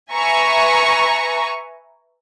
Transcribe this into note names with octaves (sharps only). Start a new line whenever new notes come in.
B4 E5 G#5 A#5 C#6